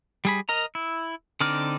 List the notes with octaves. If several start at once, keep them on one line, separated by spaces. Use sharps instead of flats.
G3 G#4 B5
A#4 D#5 A#5
E4
D3 C4 D#4 D5 F6